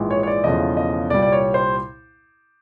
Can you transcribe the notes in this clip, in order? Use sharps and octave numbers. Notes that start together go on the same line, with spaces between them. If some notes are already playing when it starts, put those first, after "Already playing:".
Already playing: A#1 G#2 E3 G#3
C#5
C#5
D5
E1 E2 C#3 F3 A3 D#5
D#5
C2 A#2 G3 D5
D5
C#5
C5